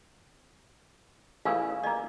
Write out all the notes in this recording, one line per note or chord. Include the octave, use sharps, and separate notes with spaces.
A1 C#3 E4 F4 F5 G#5
A#3 G#4 D5 D#5